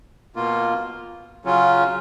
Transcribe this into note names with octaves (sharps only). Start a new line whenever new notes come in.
B2 A#3 F4
C#3 F#3 C#4 F4